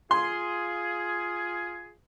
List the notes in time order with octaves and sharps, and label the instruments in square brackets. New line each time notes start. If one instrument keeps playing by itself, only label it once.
[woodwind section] F4 G#4 [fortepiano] C6